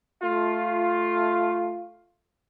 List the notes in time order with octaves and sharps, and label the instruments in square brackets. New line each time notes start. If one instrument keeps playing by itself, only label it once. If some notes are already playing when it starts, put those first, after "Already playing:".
[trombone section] A3 F4